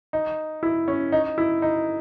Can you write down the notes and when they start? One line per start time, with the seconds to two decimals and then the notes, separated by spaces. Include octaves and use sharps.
0.13 D#4
0.63 E4
0.88 C#4
1.12 D#4
1.38 E4
1.62 D#4